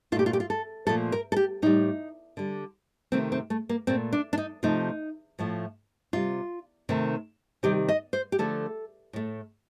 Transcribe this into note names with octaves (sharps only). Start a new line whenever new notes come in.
A#2 A3 F4 G4
F4
G4
F4
A4
A#2 F3 A3 A4
A#4
A4
G4
A2 G3 D#4
D3 G3
C3 D#3 A3 C4
C4
A3
A#3
A#2 A3 C4
D4
D4
D#4
C3 F3 A3 D#4
A2 F3 A3
C3 G3 F4
C3 D#3 A3
C3 D#3 G3 G4
D#5
C5
G4
D3 F3 A3 A4
A2 A3